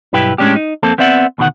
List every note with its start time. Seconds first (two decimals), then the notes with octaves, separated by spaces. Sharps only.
0.13 B1 G2 E4 G4 B4 G5
0.38 A2 G#3 C#4 D4 G4
0.56 D#4
0.83 F2 A#3 C4 A4
0.98 B3 C4 D5 E5 F#5
1.38 D2 B2 D#3 F#4 F#5